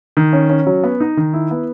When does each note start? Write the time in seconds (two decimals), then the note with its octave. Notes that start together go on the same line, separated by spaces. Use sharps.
0.17 D#3
0.33 C#4
0.50 C#4
0.67 F#3
0.84 B3
1.00 D#4
1.17 D#3
1.34 E4
1.51 B3